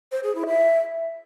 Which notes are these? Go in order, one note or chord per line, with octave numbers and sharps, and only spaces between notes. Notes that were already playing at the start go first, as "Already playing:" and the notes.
C5
G#4
E4
E5